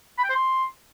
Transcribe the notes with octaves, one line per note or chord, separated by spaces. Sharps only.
B5
G5
C5
C6